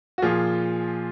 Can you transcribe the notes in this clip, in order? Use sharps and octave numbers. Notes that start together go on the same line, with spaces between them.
F#4
A#2 F3 F4 G#4